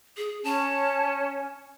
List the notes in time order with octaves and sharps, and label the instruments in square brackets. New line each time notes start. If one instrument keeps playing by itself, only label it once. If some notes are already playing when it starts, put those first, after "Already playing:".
[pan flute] G#4
[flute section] C#4 [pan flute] A5